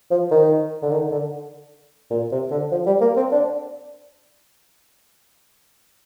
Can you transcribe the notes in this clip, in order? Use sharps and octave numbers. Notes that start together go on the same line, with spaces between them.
F3
D#3
D3
D#3
D3
A#2
C3
D3
F3
G3
A#3
C4
D4